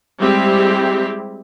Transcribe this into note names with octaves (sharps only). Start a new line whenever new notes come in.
G3 G#3 C4 E4 G4